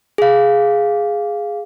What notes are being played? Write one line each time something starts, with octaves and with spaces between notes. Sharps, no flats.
G#4 F5